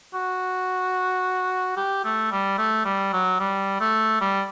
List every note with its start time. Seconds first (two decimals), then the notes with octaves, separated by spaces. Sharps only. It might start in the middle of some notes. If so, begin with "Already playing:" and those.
0.14 F#4
1.77 G4
2.04 A3
2.32 G3
2.58 A3
2.85 G3
3.13 F#3
3.40 G3
3.80 A3
4.21 G3